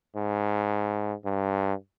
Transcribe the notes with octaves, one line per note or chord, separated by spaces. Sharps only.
G#2
G2